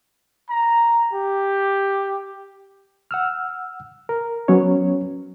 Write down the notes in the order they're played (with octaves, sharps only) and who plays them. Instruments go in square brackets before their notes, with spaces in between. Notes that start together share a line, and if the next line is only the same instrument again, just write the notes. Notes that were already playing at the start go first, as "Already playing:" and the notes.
[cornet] A#5
G4
[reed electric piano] F#5 E6 F6
A#4
F#3 B3 C#4 C#5